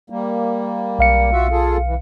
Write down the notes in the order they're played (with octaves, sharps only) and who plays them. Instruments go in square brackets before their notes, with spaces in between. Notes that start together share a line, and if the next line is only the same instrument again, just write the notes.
[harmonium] G3 A#3
[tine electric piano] B1 F5 C#7
[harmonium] F4 F#4 E5
F4 G#4 A4
E3